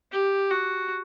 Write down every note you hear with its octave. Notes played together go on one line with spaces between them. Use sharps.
G4
F#4